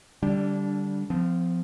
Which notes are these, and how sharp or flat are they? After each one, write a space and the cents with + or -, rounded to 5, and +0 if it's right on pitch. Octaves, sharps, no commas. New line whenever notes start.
D3 +0 G3 +0 D4 -20
F3 +0 C4 -35